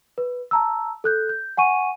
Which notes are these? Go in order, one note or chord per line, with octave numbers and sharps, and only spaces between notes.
B4
A5 A#5 E6
A4 F#6 G6
G6
F#5 G#5 C#6 D#7